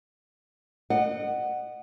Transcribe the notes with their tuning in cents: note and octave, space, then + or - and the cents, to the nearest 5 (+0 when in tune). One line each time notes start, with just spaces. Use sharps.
D#5 -35 F#5 +0